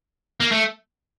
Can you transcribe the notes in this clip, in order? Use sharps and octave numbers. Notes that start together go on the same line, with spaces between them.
A#3
A3